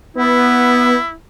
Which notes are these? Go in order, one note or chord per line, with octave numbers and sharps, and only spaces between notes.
B3 E4